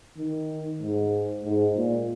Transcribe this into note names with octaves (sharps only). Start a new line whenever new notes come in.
D#3
G#2
G#2
A#2